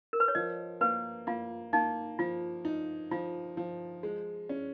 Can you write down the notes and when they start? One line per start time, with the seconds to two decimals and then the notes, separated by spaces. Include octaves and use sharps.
0.13 A#4
0.20 B4
0.28 C#5
0.35 F3 D#5
0.81 A#3 B4
1.27 A#3 F4
1.73 A#3 D#4
2.19 F3 F4
2.65 D#4
3.11 F3 F4
3.57 F3
4.03 G#3
4.49 C#4